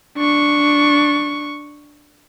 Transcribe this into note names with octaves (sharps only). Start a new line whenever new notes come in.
D4 C#6